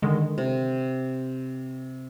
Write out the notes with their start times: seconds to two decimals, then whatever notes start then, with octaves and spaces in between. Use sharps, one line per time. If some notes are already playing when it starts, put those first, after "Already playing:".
0.02 D3 D#3 G#3
0.38 C3